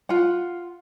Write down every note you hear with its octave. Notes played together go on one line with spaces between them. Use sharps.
F4 F#5